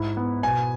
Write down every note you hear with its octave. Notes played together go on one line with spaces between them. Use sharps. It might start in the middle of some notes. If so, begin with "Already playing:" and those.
Already playing: G#2 E4
B3
B2 G#5